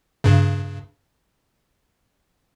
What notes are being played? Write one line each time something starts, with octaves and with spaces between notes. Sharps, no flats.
G2 C#3